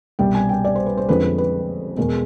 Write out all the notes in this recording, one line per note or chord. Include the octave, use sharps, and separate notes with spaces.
C2 B2 G3 G5
G#5
G5
D5
C5
B4
C5
F2 D3 F3 G#3 B4
B4
B4
E2 B2 G#3 A#4